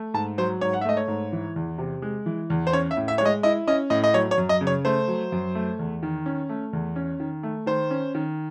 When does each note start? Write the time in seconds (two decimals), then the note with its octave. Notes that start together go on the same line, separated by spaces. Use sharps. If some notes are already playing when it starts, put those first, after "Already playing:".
Already playing: A3
0.14 G#2 A5
0.38 F#3 C5
0.61 G#2 C#5
0.73 F#5
0.81 E5
0.85 A3 D#5
0.97 C#5
1.08 G#2
1.32 E3
1.56 E2
1.78 C3
2.02 G#3
2.26 E3
2.50 E2
2.67 C5
2.73 C#4 C#5
2.91 E5
2.97 A2
3.08 E5
3.18 G#3 C#5
3.25 D#5
3.43 E4 D#5
3.67 C#4 D#5
3.90 A2 D#5
4.04 D#5
4.14 F#3 C#5
4.31 C#5
4.38 F#2
4.49 D#5
4.61 C#3
4.67 C#5
4.85 A3 C5
5.08 F#3
5.32 F#2
5.55 A3
5.79 E2
6.03 D#3
6.26 C#4
6.49 A3
6.73 E2
6.96 C#4
7.20 D#3
7.43 A3
7.66 D#3 C5
7.91 C#4
8.15 D#3